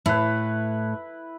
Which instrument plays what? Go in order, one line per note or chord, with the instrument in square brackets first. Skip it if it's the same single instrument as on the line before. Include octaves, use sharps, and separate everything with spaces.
[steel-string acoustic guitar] A2 [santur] E4 B4